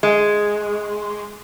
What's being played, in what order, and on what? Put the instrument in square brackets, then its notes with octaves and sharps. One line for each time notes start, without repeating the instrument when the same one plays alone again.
[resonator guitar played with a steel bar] G#3